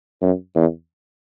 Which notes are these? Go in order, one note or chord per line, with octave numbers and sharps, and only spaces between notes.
F#2
E2